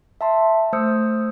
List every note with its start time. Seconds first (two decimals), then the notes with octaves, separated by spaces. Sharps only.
0.21 E5 A5 C6
0.73 A3 C5 D#6 E6 G6 C#7